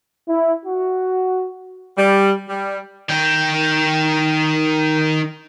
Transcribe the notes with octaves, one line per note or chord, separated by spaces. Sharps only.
E4
F#4
G3
G3
D#3 G5